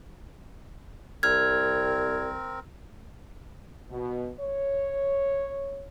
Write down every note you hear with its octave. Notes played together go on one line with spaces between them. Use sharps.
C2 C4 A#4 F6 G#6
B2
C#5